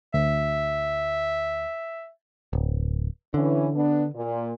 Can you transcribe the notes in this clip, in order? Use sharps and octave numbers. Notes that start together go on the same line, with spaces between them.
D2 E5
D1
D3 E3 C#4
B3 D4
A#2